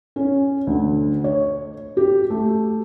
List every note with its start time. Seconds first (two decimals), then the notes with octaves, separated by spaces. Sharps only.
0.16 C#4
0.67 D2
1.24 C#5
1.97 G4
2.30 A3